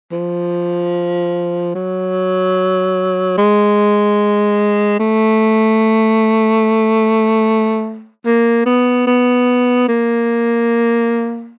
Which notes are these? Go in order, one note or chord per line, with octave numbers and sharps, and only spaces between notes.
F3
F#3
G#3
A3
A#3
B3
B3
A#3